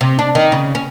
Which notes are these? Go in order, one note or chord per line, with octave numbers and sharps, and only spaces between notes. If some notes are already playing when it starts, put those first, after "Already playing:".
C3
D4
D#3
C#3
C#4